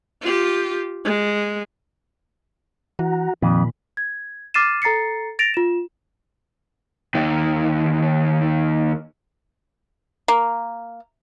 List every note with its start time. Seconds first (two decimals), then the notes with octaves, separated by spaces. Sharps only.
0.22 F4 G4
1.05 G#3
2.99 E3 F#4 F#5 A#5
3.42 F2 A#2 D#3 B5
3.97 G#6
4.54 D6 F6 A6 C7 D#7 E7
4.82 A4 A#5 A6 C7 C#7
5.39 A6 A#6 D7 F7
5.54 F4 E7
7.15 D#2 D#3
10.28 A#3